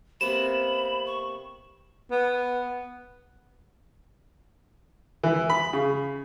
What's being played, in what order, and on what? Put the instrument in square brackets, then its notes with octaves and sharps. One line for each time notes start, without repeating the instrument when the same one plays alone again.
[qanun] C3 A#3 B3 [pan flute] B5 [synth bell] E7
[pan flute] C#6
[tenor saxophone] B3
[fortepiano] E3
B5
C#3